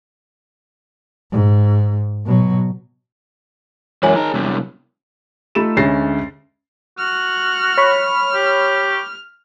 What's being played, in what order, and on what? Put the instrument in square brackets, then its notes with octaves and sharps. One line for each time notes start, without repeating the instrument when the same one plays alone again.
[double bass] G#2
B2 F#3
[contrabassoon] F#2 [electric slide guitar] E3 G#3 [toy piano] C#5 G#5
[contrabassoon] D#3 [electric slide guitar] G#4 A#4 A#5
[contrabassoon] E1 [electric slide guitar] C3 F#3 G3
[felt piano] A3 D#4 F4 A4 B5 E7
D2 G#3 C#4 A6 A#6 C7
[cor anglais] F#4 [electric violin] F6
[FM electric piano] C#5 B5 C#6
[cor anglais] G4